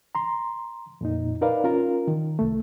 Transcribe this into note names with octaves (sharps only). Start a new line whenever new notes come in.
A#5 C6
F2 A#2 D#4
D#4 A#4 B4 D5 F5
C#4 F4 A#4
D#3
C2 A3